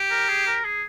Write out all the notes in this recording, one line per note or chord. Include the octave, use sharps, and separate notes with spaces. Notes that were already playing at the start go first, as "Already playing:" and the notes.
Already playing: G4
A#4
G#4
A#4
G#4